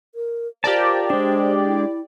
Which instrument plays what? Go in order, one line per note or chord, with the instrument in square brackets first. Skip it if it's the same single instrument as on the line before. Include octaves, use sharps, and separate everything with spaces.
[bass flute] A#4
[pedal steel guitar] F4 A#4 A5 [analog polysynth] G4 D5 [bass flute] C5
[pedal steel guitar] G#3 D4 [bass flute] C5
[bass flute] E4